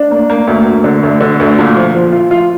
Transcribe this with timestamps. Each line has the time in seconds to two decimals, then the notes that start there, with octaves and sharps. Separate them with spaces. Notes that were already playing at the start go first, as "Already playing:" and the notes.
Already playing: D4
0.11 A#3
0.30 A#3
0.47 D2
0.66 D2
0.84 D3
1.03 D2
1.20 D3
1.40 D2
1.58 A#2
1.76 F3
1.95 F3
2.13 F4
2.31 F4